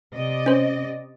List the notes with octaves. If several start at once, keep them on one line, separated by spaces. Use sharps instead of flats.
C3 D5 D#5
C#4 C5